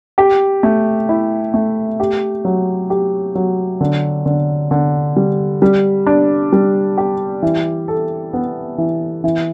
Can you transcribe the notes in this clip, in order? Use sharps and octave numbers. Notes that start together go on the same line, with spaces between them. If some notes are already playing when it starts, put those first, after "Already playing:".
G4
A3
E4
A3
G4
F#3
G4
F#3
D3
D3
D3
G3
G3
D4
G3
G4
E3
A4
B3
E3
E3